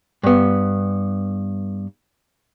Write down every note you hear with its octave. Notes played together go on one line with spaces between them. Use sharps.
G2 B3